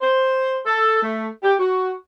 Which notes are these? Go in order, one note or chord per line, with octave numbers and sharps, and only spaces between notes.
C5
A4
A3
G4
F#4